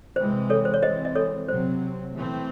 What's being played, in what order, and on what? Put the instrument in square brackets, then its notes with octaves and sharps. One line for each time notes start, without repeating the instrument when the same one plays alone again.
[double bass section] C3 E3 G#3 C4 [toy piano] C5
[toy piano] A4 C#5
C5
C#5
[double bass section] E3 G#3 C4 [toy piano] C5 D#5
[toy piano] D#5
A4 C#5
[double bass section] C3 F#3 C4 [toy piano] C5
[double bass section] E3 A3 C4